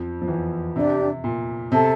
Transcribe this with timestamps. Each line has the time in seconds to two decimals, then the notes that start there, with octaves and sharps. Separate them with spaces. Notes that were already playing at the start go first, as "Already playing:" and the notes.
Already playing: F2 F3
0.22 F3
0.28 E2 E3
0.75 C3 D4 G4 D5
1.24 A#2
1.72 C3 A4 E5 A5